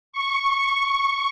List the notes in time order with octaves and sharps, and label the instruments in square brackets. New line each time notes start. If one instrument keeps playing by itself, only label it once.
[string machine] C#6